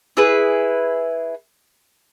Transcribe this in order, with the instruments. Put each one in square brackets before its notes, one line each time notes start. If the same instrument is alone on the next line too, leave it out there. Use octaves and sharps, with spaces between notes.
[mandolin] E4 G#4 B4